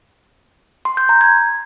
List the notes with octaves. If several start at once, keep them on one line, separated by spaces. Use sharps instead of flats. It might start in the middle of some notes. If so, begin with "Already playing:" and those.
C6
G6
A#5
G#6